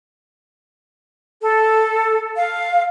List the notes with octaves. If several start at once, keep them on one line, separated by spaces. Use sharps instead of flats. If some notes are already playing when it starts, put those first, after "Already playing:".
A4
F5